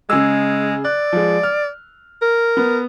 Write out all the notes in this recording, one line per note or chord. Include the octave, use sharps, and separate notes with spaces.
C#3 G#3 G#4 E6
D5 F#6
F3 G#3
F6
A#4
B3